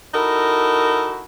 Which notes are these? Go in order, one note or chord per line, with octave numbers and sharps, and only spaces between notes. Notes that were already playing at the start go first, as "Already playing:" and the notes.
D#4 E4 F#4 A4 A#4